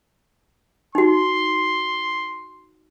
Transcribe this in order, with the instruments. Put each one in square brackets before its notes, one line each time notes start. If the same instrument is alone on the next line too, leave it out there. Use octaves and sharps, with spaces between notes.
[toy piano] D#4 F#4 [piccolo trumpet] C6